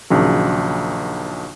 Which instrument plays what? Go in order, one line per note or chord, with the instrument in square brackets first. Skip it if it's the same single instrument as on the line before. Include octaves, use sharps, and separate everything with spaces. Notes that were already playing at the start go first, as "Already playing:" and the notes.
[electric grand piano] A#1 D#2 C#3 F#3